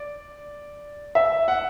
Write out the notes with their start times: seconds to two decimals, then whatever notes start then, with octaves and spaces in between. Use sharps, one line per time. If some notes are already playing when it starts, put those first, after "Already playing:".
Already playing: D5
1.15 E5
1.48 F#5